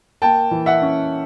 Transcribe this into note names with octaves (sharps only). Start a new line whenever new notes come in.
A#3 G5 A5
E3
E5 F#5
C#4